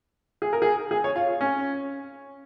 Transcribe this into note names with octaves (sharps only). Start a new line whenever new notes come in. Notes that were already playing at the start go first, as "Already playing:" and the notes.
G#4
A#4
G#4
G#4
C#5
F4
F4
C#4